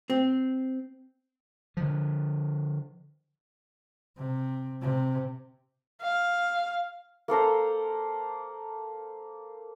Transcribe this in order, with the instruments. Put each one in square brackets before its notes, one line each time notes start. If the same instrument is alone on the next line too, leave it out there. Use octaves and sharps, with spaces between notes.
[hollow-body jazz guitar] C4
[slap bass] D3 F3
[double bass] C3
C3
[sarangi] F5
[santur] A#3 A4 C5 A#5